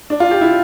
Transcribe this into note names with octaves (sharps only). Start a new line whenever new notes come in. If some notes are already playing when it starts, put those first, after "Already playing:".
D4
F4
G4
E4